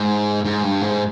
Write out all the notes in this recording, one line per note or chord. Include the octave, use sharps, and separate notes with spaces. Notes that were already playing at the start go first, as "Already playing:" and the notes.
Already playing: G#2
G#2
G2
G#2